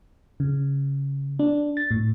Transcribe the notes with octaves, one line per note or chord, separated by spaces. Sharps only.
C#3
D4
A6
A2